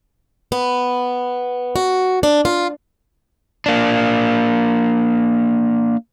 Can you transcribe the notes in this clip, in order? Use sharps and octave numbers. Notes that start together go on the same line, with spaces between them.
B3
F#4
D4
F4
A#3 D4